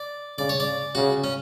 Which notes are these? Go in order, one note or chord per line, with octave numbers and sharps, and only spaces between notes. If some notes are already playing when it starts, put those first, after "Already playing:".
Already playing: D5
C#3 D5
C#5
D5
C#3 F#4
C#4